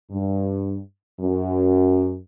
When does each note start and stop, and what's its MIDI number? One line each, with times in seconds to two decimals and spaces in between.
0.11 0.78 43
1.20 2.16 42